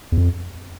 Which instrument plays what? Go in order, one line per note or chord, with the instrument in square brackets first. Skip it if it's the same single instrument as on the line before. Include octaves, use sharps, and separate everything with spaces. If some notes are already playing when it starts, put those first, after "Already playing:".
[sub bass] E2
F2